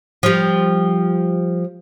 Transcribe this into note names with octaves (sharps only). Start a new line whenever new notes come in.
F3 G3